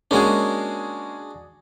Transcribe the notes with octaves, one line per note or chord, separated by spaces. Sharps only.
G#3 A#3 C#4 D4 F#4 G#4